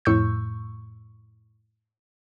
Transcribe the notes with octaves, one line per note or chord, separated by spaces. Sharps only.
F2 A2 C#6 E6 G6